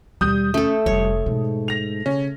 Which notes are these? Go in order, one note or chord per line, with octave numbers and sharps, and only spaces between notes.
D#2 B2 G3 D#6 G6
A3 C#4 A4
F1 G3 C#5
G#2 B2
A#6 F7
C#3 C#4